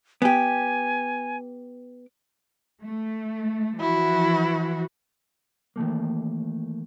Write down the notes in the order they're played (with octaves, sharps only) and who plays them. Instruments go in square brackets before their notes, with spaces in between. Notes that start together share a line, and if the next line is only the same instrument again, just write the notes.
[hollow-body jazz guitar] B3 G4 [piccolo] G#5
[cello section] A3
[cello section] E3 F3 F#4 [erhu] E4
[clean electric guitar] D#3 E3 A3 A#3